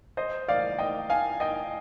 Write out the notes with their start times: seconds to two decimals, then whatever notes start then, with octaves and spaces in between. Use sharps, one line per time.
0.17 C5 D#5
0.48 D5 F5
0.79 D#5 G5
1.10 F5 G#5
1.40 D#5 G5